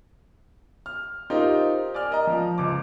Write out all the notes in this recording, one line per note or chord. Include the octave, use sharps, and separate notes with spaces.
F6
D#4 F4 G4 A#4 C5
D5 G#5 F6
A#4 D#5 A#5
F3
C#2 D6